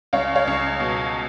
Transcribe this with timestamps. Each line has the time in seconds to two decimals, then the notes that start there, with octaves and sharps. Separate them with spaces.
0.13 C#2 C#5 F5
0.35 C#5 F5
0.47 C#2
0.80 B2